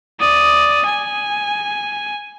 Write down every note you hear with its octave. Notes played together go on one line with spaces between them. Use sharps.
D5 D#6
G#5